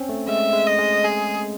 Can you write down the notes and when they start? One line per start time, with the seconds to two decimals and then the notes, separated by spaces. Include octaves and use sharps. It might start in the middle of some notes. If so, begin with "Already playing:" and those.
Already playing: C4 C#4
0.09 A3
0.28 G#3 E5
0.53 G#3
0.67 D#5
0.79 G#3
1.04 G#4